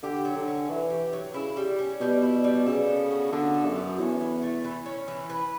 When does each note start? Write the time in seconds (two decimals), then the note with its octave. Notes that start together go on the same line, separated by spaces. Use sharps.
0.03 D3 G4
0.25 F#3
0.36 D3
0.47 C#4
0.68 E3 F#3
0.90 G4
1.13 F#3
1.34 C#3 E4
1.57 G3
1.78 C#4
2.01 B2 G3
2.22 E4
2.44 G3
2.66 C#3 A4
2.88 B3
3.11 F#4
3.32 D3 B3
3.54 A4
3.65 F#2
3.75 B3
3.98 E2 C#4
4.21 E3
4.42 A3
4.64 E3
4.86 C#4
5.08 E3
5.30 B4